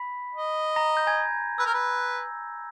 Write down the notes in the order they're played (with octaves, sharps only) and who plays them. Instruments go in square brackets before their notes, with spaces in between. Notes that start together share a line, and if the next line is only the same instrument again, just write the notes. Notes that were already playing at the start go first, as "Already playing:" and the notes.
Already playing: [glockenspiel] B5 B6
[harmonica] D#5
[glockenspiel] A#5 A#6
G6
G#5 G#6
[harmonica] B4 [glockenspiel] E6
[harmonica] A#4
B4